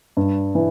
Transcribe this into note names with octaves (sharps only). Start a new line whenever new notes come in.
G2
E3